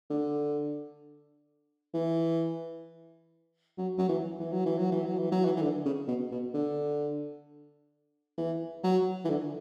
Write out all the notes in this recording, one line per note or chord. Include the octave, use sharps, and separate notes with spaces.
D3
E3
F#3
F#3
E3
E3
F#3
E3
F#3
E3
F#3
E3
F#3
E3
E3
D3
C#3
B2
B2
D3
E3
F#3
E3
D3